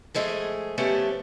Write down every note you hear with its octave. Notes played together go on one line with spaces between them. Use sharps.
F3 G#3 A3 G#4
F3 A3 B3 C#4 G4